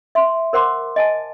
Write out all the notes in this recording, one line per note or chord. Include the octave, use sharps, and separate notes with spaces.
E5 C6
A#4 C5 F#5 C6 D6
D#5 G#5 A5